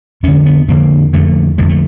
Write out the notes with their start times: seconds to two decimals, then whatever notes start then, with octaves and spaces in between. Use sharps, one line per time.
0.23 F2 D3 C#4
0.46 B3
0.68 F2 D3 A#3
1.13 F2 D3 A3
1.58 F2 D3 G#3
1.69 A3